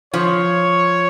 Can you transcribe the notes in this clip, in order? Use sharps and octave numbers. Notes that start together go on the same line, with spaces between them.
F3 C#5